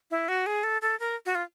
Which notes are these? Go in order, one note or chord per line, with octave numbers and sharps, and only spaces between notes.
E4
F#4
G#4
A4
A4
A#4
F#4
F4